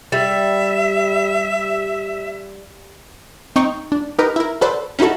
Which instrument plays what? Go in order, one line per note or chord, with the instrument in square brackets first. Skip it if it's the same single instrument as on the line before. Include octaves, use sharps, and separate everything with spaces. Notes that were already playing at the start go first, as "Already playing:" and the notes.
[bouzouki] G3 [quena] E5
[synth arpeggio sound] C4 D#4 G5 C#6
D4
D#4 G4 A#4 B4
E4 A#4
F#4 A4 B4 C5 D5
C#4 D#4 E4 F#4 A4